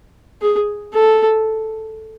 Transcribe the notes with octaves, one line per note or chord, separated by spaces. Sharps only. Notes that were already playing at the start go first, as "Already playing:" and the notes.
G#4
A4